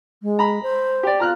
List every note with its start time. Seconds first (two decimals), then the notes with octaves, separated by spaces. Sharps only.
0.22 G#3
0.39 A#5 B5
0.62 C5
1.03 G4 D5
1.20 F4 A#5 F6 F#6